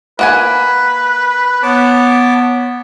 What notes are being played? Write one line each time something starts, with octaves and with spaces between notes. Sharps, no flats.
A#3 B4 F#5 G#5
B3 C#5 A5 D6